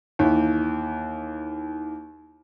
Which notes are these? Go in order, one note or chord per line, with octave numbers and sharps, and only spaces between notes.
D#2 E3